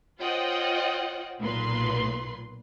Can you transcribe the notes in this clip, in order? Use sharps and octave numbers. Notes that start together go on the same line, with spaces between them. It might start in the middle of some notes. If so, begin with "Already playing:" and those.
F4 C5 C#5 D#5 F#5 G5
B1 A#2 B4 C6